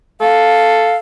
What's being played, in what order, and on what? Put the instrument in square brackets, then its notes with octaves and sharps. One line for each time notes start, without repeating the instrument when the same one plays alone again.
[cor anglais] A4 [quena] F5